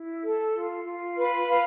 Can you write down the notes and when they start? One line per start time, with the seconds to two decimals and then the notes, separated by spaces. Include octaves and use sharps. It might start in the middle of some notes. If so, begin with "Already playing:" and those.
Already playing: E4
0.23 A4
0.55 F4
0.85 F4
1.16 B4
1.48 F5